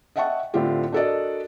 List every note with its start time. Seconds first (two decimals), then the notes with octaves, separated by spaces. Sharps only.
0.16 D#5 E5 F#5 G5 A5 C#6
0.54 A2 D3 C4 F4 G4
0.92 D4 F#4 A4 A#4 D5 D#5